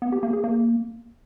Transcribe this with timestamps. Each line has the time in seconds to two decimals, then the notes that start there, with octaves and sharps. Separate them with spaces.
0.02 B3
0.12 G4
0.23 A#3
0.33 G#4
0.44 A#3